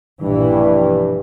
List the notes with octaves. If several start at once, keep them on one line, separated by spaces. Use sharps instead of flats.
A#1 G2 B2 E3